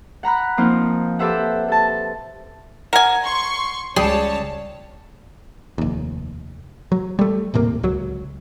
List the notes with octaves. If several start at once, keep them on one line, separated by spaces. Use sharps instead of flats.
F#5 A#5 B5 F#6
F3 A#3 C4 D#4 F4
G4 A4 B4 C5 E5 F#5
A4 A5
A#4 F#5 G#5
C6 C#6
C#2 G3 G#4 C#5 A5
F1 D#2
F#3
G3 A3
D#1 A2 C3 A#3
C#2 F#3